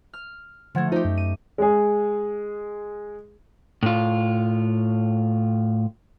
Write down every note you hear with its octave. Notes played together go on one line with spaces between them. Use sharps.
F6
D3 F3 A3 F#5 G#6
D#4 F4 G4 C5
F#2
D#7
G#3 G#4
A2 F4